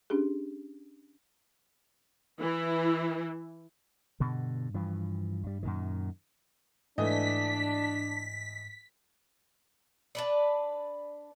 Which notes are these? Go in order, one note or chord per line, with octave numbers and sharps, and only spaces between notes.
C#4 D4 G4 G#4
E3 E4
G2 B2 D3
G2 E3 F3
G2 G3
F#2 A#2 D#3
G#2 E3 A3 D4 D#5 B6
D4 B4 D5